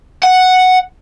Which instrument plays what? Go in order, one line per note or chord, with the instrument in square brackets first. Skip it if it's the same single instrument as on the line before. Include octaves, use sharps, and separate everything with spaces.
[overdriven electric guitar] F#5